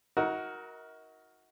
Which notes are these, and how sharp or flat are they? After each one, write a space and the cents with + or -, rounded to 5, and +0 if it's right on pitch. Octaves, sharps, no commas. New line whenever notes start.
D#4 +40 F#4 +0 A#4 +10